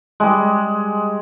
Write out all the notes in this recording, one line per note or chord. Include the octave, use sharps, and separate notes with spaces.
G3 G#3